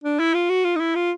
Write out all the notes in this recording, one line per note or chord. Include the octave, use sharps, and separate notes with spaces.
D4
E4
F4
F#4
F4
D#4
E4
F4